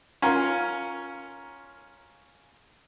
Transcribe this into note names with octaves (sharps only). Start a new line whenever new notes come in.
C#4 F4 A#4